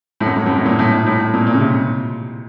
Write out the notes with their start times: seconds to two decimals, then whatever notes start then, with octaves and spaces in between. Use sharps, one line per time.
0.20 A2
0.26 F#2
0.36 A2
0.46 F#2
0.56 A2
0.65 A#2
0.79 A2
0.92 A2
1.06 A2
1.19 A2
1.34 A#2
1.47 A#2
1.54 C#3
1.60 C3